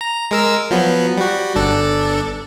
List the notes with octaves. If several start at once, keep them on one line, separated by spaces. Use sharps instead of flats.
A#5
G#3 A#4 E6
F3 F#3 B3
G3 F#4
G1 D4 A4